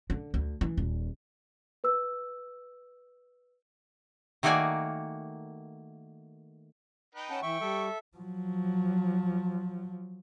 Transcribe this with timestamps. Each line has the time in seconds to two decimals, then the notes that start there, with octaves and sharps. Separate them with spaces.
0.10 D3
0.34 D2
0.61 E3
0.77 D#1
1.84 B4 E6
4.43 D#3 A3 A#3 F#4 D5 G#5
7.15 D#4 B4 G5
7.30 C#4 F#5 A5
7.42 E3 E5 G5 C#6
7.61 G3 A4 E5
8.17 F3 F#3